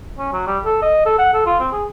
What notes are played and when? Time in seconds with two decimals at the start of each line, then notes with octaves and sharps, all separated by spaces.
0.19 C#4
0.33 F#3
0.47 G3
0.65 A4
0.82 D#5
1.06 A4
1.19 F#5
1.34 A4
1.46 F4
1.60 C4
1.72 G#4